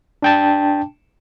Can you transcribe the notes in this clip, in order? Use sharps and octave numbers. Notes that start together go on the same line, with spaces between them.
D4 G5 A5